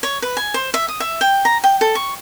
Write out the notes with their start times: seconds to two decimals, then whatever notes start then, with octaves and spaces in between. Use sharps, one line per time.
0.03 C#5
0.22 B4
0.37 G#5
0.54 C5
0.74 E5
0.88 D#6
1.00 E5
1.21 G5
1.45 A#5
1.64 G5
1.81 A4
1.95 C#6